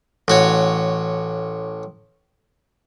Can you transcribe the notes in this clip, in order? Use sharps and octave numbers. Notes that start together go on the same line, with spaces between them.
A1 F#4 C#5